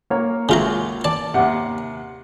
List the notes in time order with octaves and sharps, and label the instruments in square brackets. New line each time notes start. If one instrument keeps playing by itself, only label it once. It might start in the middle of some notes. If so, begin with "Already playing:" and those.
[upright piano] A#3 A#4 C#5
[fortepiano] C#2 E5 [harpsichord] C#3 F4 A#5
[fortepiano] D5 [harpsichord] A5
[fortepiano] D#2 C3 [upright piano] F#5